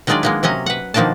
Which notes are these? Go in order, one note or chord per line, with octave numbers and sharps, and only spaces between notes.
D#3 F#3 G#3 D4 F4 D5
G#3 A#3 B3
C3 F#3 C#4 D#5
B4 F#5
B2 D#3 F3 A#3 D4 A5